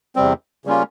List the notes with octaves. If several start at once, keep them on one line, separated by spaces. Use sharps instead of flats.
E2 C3 G3 C4
C#3 G3 A#3 C#4 F4